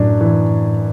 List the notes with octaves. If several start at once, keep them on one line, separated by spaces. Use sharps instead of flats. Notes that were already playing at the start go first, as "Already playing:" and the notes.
Already playing: F#2 A2 D4
E3